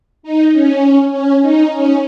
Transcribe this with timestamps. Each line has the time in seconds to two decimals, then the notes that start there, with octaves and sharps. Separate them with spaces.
0.23 D#4
0.53 C#4
1.12 C#4
1.42 D#4
1.72 C#4